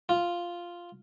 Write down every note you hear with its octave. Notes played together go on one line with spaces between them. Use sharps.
F4